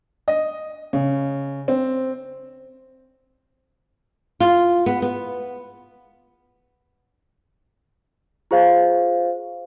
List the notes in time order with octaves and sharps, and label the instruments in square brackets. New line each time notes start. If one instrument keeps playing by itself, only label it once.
[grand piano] D#5
C#3
C4
[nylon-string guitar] F4
B3
B3
[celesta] F4 G#4 C5 F5